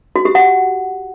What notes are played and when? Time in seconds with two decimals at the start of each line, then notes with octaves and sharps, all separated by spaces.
0.16 F#4
0.25 G4
0.35 F#5